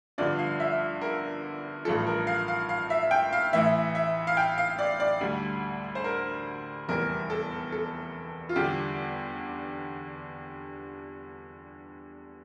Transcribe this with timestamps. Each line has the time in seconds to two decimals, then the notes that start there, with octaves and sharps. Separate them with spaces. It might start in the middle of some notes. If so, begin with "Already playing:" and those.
0.18 G1 G2 D3 F3 D5
0.39 F5
0.60 E5
1.01 A#4
1.85 A1 G2 F3 A4
2.07 A#4
2.27 F5
2.48 F5
2.69 F5
2.90 E5
3.11 G5
3.33 F5
3.53 A1 A2 E3 E5
3.95 E5
4.27 F5
4.37 G5
4.58 F5
4.79 D5
5.00 D5
5.21 D2 D3 G3
5.95 C5
6.04 A#4
6.88 F1 E2 E3 G3 A#4
7.30 A4
7.72 A4
8.49 F4
8.56 E2 D3 G3 G4